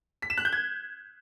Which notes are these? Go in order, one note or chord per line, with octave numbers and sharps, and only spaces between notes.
B6
E7
F#6
G6
G#6